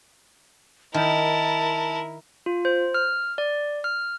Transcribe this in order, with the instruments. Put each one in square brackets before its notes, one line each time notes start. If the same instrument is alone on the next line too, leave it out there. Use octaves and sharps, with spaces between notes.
[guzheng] D#3 [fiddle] E4 A#4 [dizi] A5
[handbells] F4
C5
F6
D5
F6